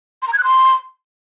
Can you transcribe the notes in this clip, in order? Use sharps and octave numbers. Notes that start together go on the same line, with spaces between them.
C6
A#5
G#6
F#6
C6